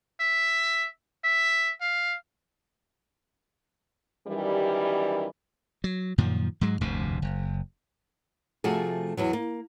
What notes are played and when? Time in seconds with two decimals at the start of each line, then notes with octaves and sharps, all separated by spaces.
0.20 E5
1.25 E5
1.81 F5
4.26 F#2 D#3 E3 G3
5.84 F#3
6.18 F#2 A#2 D#3 F3
6.61 G#2 F#3 G#3
6.81 F1 D2 G2 C3
7.22 F#1
8.64 C3 F3 A3 F#4 G#4
9.17 E2 E3 F#3
9.33 A#3